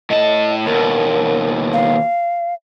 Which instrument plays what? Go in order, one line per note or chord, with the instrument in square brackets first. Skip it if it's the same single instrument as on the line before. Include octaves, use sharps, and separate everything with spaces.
[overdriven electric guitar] A2 A5 [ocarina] D#5
[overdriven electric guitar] D#2 B2 [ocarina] A#4
[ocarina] F5